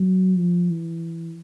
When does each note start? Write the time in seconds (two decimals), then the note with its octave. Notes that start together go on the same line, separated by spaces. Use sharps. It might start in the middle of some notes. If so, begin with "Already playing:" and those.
Already playing: F#3
0.37 F3
0.71 E3